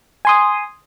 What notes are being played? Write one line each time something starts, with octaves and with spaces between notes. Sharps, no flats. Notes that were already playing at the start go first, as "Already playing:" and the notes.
G#5 C6 D#6